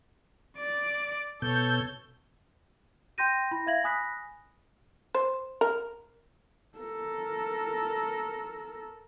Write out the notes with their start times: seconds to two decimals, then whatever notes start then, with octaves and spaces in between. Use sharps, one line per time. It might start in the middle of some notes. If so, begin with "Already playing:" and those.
0.57 D5 D7
1.42 B2 A4 C#5 G6
3.18 G5 C6 G6 A#6 D#7
3.51 E4 B5 A#6
3.67 E5 F5 G#6 A#6 F#7
3.84 G#5 B5 D#6 F#6 A#6 B6
5.15 C5
5.61 A#4
6.78 A4 A#4